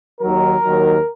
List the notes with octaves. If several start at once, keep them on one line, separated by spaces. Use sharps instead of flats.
D#2 D#3 F#3 A#4
D#2 D#3 F#3